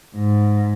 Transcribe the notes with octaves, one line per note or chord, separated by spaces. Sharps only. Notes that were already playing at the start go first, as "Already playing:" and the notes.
G#2